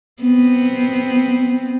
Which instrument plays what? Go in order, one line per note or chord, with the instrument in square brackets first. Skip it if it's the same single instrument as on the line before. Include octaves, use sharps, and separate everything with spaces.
[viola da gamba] B3 C4